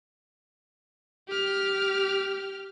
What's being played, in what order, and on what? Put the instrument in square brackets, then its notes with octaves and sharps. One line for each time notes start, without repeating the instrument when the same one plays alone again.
[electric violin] G4 F6